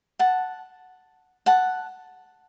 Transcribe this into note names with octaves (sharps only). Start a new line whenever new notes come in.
F#5 A5
F#5 A5